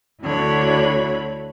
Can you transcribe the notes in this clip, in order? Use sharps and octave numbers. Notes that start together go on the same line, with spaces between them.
D2 D3 E4 F#4 C#5 B5